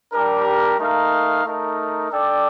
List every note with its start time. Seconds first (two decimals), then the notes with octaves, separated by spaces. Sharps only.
0.13 G3 D4 G4 A#4
0.78 A3 D#4 A#4 F5
1.44 A3 D#4 A#4
2.10 D4 A4 D5 G5